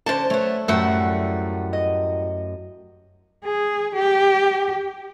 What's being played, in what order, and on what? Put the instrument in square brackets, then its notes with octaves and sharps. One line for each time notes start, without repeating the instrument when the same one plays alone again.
[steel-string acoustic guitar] D3 C#4 A5 [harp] C5 D5
[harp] A3 [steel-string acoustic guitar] B3 C#5
[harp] F#2 A3 E6 [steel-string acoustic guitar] A2 G3 F#5
[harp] D#5
[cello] G#4
G4